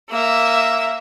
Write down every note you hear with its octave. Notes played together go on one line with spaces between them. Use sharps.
A#3 E5